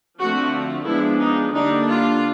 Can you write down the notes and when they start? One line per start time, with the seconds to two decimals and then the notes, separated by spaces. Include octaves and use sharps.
0.20 D3 F3 A3 C4 F#4
0.87 F3 G#3 B3 D4 E4
1.20 D#4
1.54 D3 G3 A#3 D4 D#4
1.88 F4